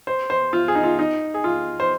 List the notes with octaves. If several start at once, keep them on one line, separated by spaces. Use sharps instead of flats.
C5
C5
F4
G#4
D#4
F4
D#4
G#4
F4
C5